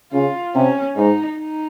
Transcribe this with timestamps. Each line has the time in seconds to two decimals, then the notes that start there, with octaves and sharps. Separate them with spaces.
0.12 C#3 F4
0.54 C3 C#4
0.96 G#2 D#4
1.39 D#4